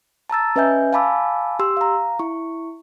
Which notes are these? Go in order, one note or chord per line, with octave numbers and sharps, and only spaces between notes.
A5 A#5 E6 A6
C#4 B4 D#5 E5 G#5 G6
F5 G#5 A5 B5 D6 E6
G4 C6 E6
F5 A#5
E4 C#6